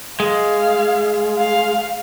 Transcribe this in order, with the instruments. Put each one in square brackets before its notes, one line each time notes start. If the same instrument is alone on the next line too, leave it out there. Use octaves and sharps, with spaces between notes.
[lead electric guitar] G#3 [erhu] F5
[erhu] F5